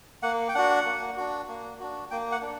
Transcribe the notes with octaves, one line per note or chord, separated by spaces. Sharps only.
A#3 F#5
G5
D4 F#4 F#5
A#3
D4 F#4
A#3
D4 F#4
A#3 G5
F#5
D4